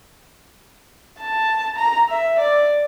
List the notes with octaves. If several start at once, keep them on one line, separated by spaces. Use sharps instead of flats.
A5
A#5
E5
D5